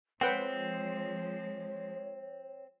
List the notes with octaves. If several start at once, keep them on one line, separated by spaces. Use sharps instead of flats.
F3 G#3 C4 B4 C#5 F#5 G5